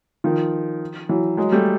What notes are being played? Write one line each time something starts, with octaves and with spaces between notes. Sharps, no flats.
D#3 F3
E3 F#3
F#3 G#3
G3 A3